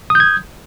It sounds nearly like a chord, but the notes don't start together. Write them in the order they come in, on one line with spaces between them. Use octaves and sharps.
D#6 G6 G#6